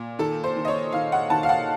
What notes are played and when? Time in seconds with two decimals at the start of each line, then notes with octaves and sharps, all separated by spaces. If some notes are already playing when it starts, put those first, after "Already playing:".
Already playing: A#2
0.19 D#3 A4
0.44 C5
0.56 D#3
0.65 D#5
0.68 C#5
0.92 D#3 F5
1.12 F#5
1.30 D#3 A5
1.43 F5
1.49 F#5